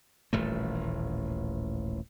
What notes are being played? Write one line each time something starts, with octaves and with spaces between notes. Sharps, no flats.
D#1 A1 A3